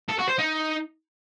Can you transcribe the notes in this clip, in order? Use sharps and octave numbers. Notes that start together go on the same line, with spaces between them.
A4
F#4
C5
D#4